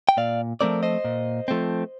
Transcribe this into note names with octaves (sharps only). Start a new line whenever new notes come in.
G5
A#2 D5 F5
F3 A3 C4 A#4 D5
C5 D#5
A#2
F3 A3 C4